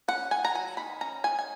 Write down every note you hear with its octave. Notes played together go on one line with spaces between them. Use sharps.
C#4 F#5
D#3 G#5
A#5
F#3 G#5
D#3 B5
C#4 A#5
D#3 G#5
G#5